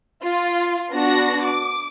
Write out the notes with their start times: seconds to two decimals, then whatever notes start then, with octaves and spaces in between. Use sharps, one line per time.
0.24 F4
0.92 B3 D4 F#4 A#6
1.42 D6